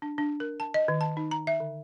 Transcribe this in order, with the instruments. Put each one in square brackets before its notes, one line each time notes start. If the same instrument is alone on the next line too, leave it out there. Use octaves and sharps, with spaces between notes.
[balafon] D4
D4
A#4
A5
D#5
D#3
A5
D#4
A#5
E5
D3